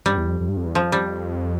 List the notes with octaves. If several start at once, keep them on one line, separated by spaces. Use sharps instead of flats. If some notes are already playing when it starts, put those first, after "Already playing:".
G2 G3
E2
F2
F2
G2
F2
E2
F2 F3
G3